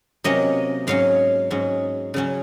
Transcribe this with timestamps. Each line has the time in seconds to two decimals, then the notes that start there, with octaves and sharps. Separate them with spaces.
0.24 C3 F#3 A#3 C#4 D#5
0.87 G#2 F#3 C#4 F5
1.51 G#2 F#3 C#4
2.14 C#3 F#3 C#4